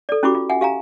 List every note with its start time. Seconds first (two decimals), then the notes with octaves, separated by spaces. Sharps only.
0.09 A4 D5
0.23 C#4 E4 F#4 G4 B5 D6
0.35 F4
0.50 E5 F#5 G#5
0.61 G4 F5 G#5 A#5